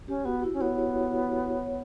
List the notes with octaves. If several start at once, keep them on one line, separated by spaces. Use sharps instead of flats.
C#4 G4
B3 F#4
E4
C#4
B3 C#5
C#5
C#5